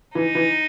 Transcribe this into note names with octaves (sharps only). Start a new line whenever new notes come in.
E3 D#4
E3